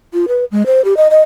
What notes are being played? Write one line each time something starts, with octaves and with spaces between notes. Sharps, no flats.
F4
B4
G#3
C5
G4
D#5
D#5